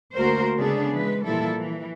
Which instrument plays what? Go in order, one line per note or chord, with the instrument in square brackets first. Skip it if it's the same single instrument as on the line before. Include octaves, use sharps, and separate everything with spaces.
[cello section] D2 A#3 F#4 A#4 C5
C#3 G#3 B3 D4 G#4 A4
E3 G#3 B4
A#2 E3 F3 G3 E4 A4
E3